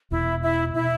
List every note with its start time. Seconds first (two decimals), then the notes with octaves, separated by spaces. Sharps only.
0.11 E1 E2 B2 E4
0.42 E4
0.73 B2 E4